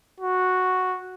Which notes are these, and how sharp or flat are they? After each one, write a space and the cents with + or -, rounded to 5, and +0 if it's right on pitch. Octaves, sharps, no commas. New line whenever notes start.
F#4 -5